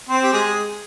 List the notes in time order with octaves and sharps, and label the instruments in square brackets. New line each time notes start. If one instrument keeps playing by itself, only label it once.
[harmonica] C4 C5
G4
G#3 G#4